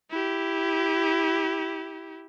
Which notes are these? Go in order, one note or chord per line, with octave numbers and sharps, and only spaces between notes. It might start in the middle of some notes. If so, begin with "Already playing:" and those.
E4 G4